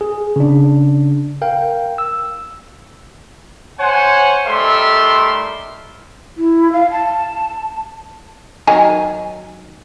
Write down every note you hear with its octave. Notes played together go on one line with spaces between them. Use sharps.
G#4
C#3 D4
A#4 F5 G5
E6
C5 C#5 F#5 G#5
G3 A3 D#4 A#4 E5 C6
E4
F5
A5
D#3 F#3 G#5